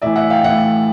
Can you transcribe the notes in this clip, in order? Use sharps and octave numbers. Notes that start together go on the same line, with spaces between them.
A2 E3 D5 E5
E5 F#5
F5 G5
G5
A2 E3 E5 F#5